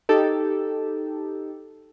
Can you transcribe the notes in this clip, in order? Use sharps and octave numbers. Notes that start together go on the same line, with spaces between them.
D#4 G4 A4